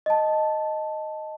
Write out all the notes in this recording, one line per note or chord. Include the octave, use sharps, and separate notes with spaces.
D#5 A5